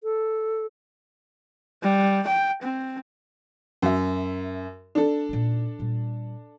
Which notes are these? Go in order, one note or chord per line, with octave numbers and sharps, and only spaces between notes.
A4
G3
G5
C4
F#2 E5
D4 A4
A#2 D#4
A#2 G3